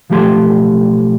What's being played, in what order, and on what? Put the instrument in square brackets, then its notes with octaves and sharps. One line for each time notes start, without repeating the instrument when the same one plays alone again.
[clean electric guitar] B1 F3 A3 G4 A#5 C6